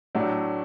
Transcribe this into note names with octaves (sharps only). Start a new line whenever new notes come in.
A2 F#3 A3 D4